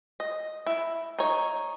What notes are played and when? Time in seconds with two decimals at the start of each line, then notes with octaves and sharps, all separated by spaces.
0.20 D#5
0.66 E4
1.19 D#4 C#5